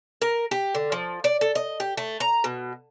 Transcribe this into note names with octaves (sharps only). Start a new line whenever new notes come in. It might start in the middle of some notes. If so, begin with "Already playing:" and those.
A#4
G4
D3
F3
D5
A4
D#5
G4
A3
A#5
B2